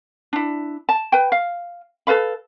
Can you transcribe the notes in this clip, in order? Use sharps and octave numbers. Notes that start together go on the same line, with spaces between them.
D4 E4
A5
B4 G5
F5
A4 B4 F5 B5